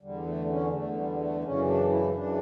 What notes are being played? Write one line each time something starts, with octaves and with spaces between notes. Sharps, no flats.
E2 D3 G3
A3
C#4
E2 D3 A3
G3
A3
F#2 C#3 E3 C#4
D4
E4
F#2 C#3 E3 D4